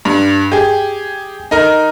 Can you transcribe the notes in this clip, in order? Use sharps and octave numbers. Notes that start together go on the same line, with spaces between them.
G2
G4 G#4
D#4 A#4